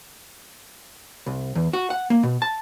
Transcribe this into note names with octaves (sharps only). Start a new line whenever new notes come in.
C2
E2
F#4
F#5
A#3
B2
A5